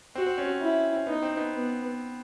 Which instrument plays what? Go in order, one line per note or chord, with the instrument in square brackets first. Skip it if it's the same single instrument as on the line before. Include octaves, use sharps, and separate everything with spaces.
[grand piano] C4 [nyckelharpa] F#4
[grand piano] C4
C#4
C4
[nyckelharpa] E4
[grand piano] C4
[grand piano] B3 [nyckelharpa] D#4
[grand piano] C4
B3
[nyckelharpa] B3